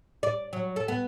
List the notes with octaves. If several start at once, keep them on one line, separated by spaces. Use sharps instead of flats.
D5
F#3
A4
B3